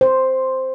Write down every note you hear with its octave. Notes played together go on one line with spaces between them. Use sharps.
C5